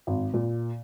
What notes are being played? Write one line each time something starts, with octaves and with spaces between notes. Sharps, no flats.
G#1
A#2